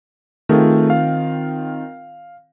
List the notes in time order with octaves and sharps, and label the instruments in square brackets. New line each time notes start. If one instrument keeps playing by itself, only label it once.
[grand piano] D#3 C4 F4 [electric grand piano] A3 G#4
[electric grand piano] F5